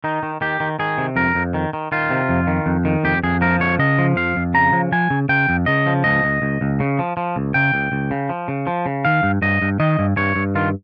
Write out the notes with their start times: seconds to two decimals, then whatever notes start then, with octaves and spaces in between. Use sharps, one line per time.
0.04 D#3 D#4
0.23 D#3
0.41 D#3 G4
0.60 D#3
0.79 D#3 G#4
0.98 C3
1.16 F2 A#4
1.35 F2
1.54 D#3
1.73 D#3
1.92 D#3 F4
2.10 C3
2.29 F2
2.47 D#3
2.66 F2
2.85 D#3
3.04 F2 G4
3.23 F2 G#4
3.41 F3 A#4
3.60 F2 C#5
3.79 C#3 D#5
3.98 F3
4.16 F2 F5
4.36 F2
4.54 C#3 A#5
4.73 F3
4.92 F3 G#5
5.10 C#3
5.29 C#3 G5
5.49 F2
5.66 C#3 D#5
5.86 F3
6.04 C#2 D#5
6.24 C#2
6.42 C#2
6.61 C#2
6.80 C#3
6.99 F3
7.17 F3
7.36 C#2
7.54 C#3 G5
7.74 C#2
7.92 C#2
8.11 C#3
8.29 F3
8.48 C#3
8.67 F3
8.86 C#3
9.05 D#3 F5
9.23 G2
9.42 G2 D#5
9.62 G2
9.80 D#3 D#5
9.99 G2
10.17 G2 C#5
10.36 G2
10.55 D#3 F4